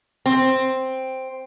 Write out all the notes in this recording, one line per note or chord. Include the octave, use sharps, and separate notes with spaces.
C4